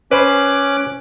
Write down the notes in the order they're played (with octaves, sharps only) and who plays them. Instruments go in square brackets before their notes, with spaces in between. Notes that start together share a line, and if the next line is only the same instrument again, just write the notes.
[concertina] C#4 D6 F#6 [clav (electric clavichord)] B4 C5